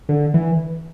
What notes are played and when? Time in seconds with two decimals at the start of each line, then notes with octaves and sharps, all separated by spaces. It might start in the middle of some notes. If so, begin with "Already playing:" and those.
0.09 D3
0.34 E3